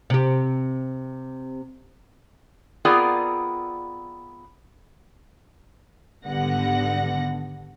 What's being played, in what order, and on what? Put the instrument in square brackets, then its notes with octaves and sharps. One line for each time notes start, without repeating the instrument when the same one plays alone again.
[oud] C3 G4
[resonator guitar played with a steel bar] B3 C4 F4 G#4 A#4 D5
[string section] G#1 D3 G3 B3 F#5 A#6